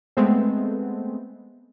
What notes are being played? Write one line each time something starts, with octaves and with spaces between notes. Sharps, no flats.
G#3 A3 B3 C4